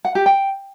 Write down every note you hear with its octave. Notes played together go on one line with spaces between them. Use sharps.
F#5
G4
G5